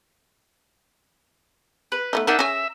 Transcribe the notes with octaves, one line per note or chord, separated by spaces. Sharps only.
B4
A3 B3 D#4
D4 D#4 A#4 E5 F#5
C#4 G#4 A#5